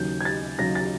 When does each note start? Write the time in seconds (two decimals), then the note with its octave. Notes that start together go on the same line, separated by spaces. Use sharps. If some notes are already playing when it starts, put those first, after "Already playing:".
Already playing: D#2 C#3 F#3 G6
0.21 G#6
0.25 A6
0.58 D#2 C#3 F#3 A#6
0.75 A6